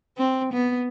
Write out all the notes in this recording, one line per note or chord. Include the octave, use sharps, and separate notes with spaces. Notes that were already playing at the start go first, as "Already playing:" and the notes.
C4
B3